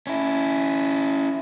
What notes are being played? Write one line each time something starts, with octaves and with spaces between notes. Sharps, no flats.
C#4 E4